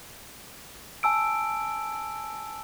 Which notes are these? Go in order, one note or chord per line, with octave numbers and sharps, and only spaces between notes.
G#5 A5 E6 D7